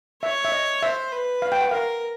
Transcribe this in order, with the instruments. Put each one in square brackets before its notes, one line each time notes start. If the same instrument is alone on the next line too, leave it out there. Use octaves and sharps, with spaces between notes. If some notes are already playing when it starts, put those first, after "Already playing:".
[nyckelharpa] C#5 [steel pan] E5
[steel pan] E5
D#5
[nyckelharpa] C5 [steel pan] E5
[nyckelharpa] B4
[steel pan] F5
G5
F#5
[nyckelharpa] A#4 [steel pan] F5